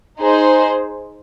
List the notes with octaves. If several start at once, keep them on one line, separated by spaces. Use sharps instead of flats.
D#4 G#4 C5